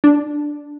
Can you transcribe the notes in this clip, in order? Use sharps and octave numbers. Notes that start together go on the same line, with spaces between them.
D4